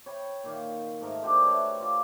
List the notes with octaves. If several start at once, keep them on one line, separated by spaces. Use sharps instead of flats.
C#5 G5 B5
A#2 D#3 F5
G#2 A3 A#4 D#5
D4 F#4 G4 C5
B4 C#5 E5
F4 D5